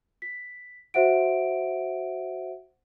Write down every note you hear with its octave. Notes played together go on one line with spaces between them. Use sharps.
B6
F#4 C5 E5 F#5 D7